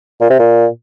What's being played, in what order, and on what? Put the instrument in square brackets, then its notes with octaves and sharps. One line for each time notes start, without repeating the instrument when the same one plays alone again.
[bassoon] A#2
C3
A#2